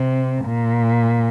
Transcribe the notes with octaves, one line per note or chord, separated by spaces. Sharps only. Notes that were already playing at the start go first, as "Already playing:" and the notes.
Already playing: C3
A#2